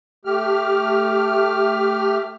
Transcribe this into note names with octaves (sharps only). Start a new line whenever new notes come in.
A3 G4 F6